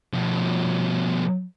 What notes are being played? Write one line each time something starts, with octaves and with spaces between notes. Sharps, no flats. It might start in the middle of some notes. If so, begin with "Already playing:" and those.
B2 F3